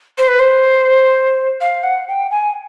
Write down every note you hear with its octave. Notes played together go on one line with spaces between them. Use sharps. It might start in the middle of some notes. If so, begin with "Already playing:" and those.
C5
B4
C5
F5
F#5
G5
G#5